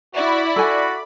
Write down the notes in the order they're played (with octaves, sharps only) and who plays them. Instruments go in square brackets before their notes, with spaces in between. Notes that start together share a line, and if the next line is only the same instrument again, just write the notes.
[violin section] E4 [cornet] F#4 [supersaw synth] D5 B5
[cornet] F#4 [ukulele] A4 G#5